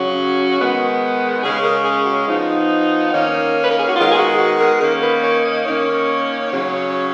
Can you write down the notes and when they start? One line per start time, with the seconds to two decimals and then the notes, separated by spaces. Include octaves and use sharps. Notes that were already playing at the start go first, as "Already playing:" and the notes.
Already playing: C#3 F#3 C#4 F#4
0.58 D#3 G#3 B3
1.42 C#3 G#3 C#4 G#4
1.64 A#4
1.85 G#4
2.06 F#4
2.28 F3 B3 D#4
3.13 D#3 A#3 C#4
3.64 B4
3.71 A#4
3.80 G#4
3.89 F#4
3.96 D#3 G#3 B3 F4
4.11 G#4
4.19 F#4
4.39 F#4
4.60 A#4
4.81 D#3 A#3 C#4 A#4
5.03 B4
5.24 C#5
5.45 D#5
5.66 D#3 A#3 C#4 C#5
6.51 C#3 F#3 C#4